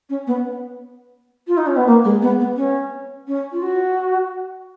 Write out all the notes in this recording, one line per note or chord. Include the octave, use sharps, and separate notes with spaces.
C#4
B3
F4
D#4
C#4
B3
A#3
G#3
B3
B3
C#4
C#4
F4
F#4